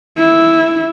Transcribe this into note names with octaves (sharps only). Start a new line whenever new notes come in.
E4